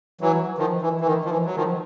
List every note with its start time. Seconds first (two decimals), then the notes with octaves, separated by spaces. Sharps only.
0.21 E3 F#3
0.58 D#3 F3
0.82 E3
1.01 E3
1.06 D#3
1.25 F3
1.31 E3
1.46 F#3
1.56 D#3 F3